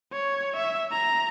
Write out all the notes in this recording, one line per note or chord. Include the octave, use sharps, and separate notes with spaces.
C#5
E5
A#5